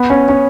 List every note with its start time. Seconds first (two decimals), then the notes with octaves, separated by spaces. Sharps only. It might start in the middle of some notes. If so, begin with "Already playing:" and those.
Already playing: B3
0.10 C#4
0.29 C#4